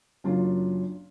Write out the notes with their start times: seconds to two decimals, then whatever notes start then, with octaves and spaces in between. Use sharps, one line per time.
0.24 F#1 F#3 D4 F4